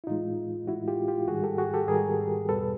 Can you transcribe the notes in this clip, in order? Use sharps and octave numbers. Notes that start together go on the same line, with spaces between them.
E4
A2 E3 G#3 D#4 F4
A2 E3 G#3 E4 F#4
F4 G4
F4 G4
G#2 D#3 G3 F#4 G#4
G4 A4
F#4 G#4
G4 A4
G#2 D#3 G3 G#4 A#4
E2 B2 G3 A4 B4